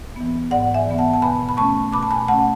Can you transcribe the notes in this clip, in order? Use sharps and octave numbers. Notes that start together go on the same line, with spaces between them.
E3 B3
G#2 D5 F#5
E5 G#5
E3 B3
F#5 A5
A5
B2 G#5 B5
B5
A3 C#4 A5 C#6
B2 B5 D6
A5
G#5 B5
A3 C#4 F#5 A5